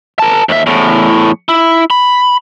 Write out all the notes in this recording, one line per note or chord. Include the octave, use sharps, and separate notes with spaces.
A#4 A5
D#2 E5
E2 A2
E4
B5